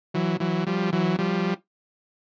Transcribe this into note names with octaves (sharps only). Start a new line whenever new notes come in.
E3 F#3
E3 F#3
F3 G3
E3 F#3
F3 G3